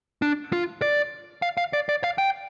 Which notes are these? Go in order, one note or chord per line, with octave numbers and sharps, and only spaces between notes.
D4
F4
D5
F5
F5
D5
D5
F5
G5